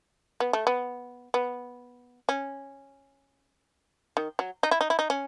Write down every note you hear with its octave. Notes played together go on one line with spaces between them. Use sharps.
B3
A3
B3
B3
C#4
D#3
F#3
D#4
E4
D#4
E4
D#4
C#4